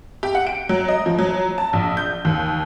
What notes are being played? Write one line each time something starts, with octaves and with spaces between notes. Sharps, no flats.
G4
F#5
D7
F#3
D#5
F3
F#3
A5
A#1
G6
D#2